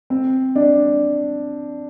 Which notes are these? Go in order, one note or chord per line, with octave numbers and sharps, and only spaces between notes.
C4
D4